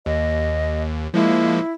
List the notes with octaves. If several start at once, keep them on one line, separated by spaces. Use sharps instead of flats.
D#2 D#5
F3 G#3 A#3 E4